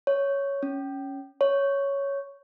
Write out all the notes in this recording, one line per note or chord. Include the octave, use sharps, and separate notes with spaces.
C#5
C#4
C#5